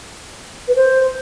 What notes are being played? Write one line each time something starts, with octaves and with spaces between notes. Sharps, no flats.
B4
C5